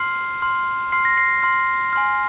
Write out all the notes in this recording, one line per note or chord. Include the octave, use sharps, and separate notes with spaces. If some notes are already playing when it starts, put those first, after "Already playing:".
Already playing: C6 F6 C7
C6 F6
C6 F6 C7
A#6
C7
C6 F6
G#5 C6 F6